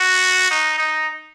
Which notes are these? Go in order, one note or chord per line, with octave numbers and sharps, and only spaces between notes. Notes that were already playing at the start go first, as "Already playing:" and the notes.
Already playing: F#4
D#4
D#4